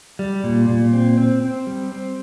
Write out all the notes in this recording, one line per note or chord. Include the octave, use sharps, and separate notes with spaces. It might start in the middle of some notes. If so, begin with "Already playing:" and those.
G3
A#2
A#2
C4
C4
C4
G3
C4